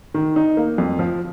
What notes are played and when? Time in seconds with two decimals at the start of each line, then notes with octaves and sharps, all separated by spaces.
0.14 D#3
0.36 D#4
0.57 A#3
0.78 F2
0.99 F3